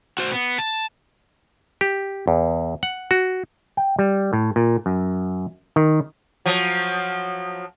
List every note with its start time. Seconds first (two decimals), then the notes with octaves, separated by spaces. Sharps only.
0.18 F#4 C5
0.32 B3
0.59 A5
1.81 G4
2.28 E2
2.83 F#5
3.11 F#4
3.77 G5
3.99 G3
4.33 A2
4.56 A#2
4.86 F#2
5.76 D#3
6.46 F3 F#3